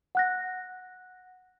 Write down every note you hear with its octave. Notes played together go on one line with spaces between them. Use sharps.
F#5 F#6 A#6